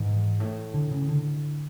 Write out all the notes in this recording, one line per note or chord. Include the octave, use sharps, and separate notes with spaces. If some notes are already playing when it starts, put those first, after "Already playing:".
Already playing: G#2 E3
A2
D3
C#3
D3